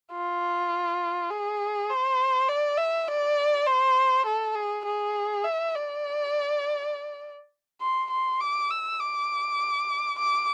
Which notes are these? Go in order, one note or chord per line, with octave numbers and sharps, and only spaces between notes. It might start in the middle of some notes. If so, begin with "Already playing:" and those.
F4
G#4
C5
D5
E5
D5
C5
A4
G#4
G#4
E5
D5
C6
C6
D6
E6
D6
D6